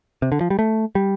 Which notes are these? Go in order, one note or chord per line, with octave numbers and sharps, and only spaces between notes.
C3
D3
F3
G3
A3
G3